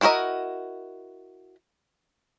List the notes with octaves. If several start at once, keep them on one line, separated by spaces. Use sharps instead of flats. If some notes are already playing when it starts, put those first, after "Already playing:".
D4 E4 F#4 A#4 D#5